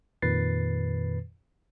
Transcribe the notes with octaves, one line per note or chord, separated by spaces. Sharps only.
F2 A#2 D#3 B4 A6 C7